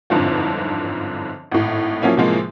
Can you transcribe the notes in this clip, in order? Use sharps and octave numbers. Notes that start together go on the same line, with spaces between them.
G1 F2 G#2 D3 E3 F3
G#1 A2
F3 F#3 A#3 C#4 E4
A2 C3 E3 F3 G#3 A#3